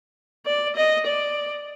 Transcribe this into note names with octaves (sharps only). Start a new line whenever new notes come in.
D5
D#5
D5